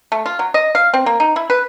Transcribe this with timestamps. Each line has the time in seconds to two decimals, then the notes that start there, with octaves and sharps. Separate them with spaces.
0.12 A3
0.26 F4
0.39 F#3
0.54 D#5
0.75 F5
0.94 C4
1.06 A#3
1.20 D#4
1.36 E4
1.50 B4